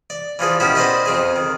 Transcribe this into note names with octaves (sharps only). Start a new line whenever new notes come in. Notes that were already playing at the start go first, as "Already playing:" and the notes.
D5
E3 F3 G#4 D5
B2 D#3 C#4 E4 F#4 G4
B4 C5 D5 D#5 G5 A5
F2 C4 G#4
D#3